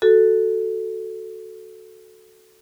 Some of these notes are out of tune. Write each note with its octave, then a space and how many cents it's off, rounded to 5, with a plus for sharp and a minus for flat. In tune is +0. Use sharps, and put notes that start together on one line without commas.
F#4 +0 A4 +0